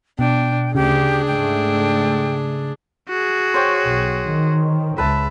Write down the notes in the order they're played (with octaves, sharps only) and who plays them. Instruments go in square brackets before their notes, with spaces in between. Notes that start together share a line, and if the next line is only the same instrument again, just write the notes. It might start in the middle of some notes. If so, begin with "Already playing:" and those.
[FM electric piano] B2 [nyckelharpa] D4 [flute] G5
[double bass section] D2 [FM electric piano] C#3 [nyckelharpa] D4 G#4 [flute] G4
[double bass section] G#2 A3 [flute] G5
[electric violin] F#4 G#4
[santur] C5 C#5 G5
[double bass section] B1
D#3
[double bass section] C#2 [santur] B4 A5 [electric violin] E5